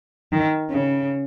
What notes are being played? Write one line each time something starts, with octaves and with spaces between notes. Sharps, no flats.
D#3
C#3